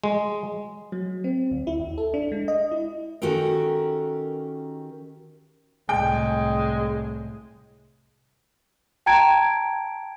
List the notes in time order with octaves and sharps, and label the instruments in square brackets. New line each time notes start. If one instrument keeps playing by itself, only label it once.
[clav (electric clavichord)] G#3
[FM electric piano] F#3
C4
D2
E4
D#2
A4
D4
G#3
D#5
E4
[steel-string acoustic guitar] D#3 C#4 F#4 G4 A4 A#4
[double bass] C2 A2 [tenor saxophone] G#3 [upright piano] G5
[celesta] G5 A5 A#5 G#6 D7